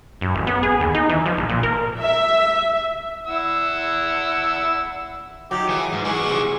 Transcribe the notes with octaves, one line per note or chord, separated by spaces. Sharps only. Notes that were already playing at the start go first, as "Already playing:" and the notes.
F#2
A1
B3
G#4
D#2
D#4
E3
F3
A#1
A#2
A#4
E5
E4 F#5 E6
D#3 F#3 G4 D6
E3 G#4
G#2
E3 G#4 D5 F#5 C#6
C3 E3